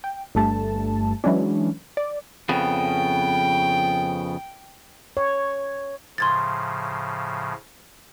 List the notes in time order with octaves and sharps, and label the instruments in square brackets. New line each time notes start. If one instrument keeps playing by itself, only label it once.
[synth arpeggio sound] G5
G1 G2 A3 A5
E3 F#3 G#3 C#4 D4
D5
[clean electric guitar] F2 C#3 B3 [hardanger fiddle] G5
[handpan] C#5
[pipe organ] A2 C#3 F3 [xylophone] C6 G#6 A6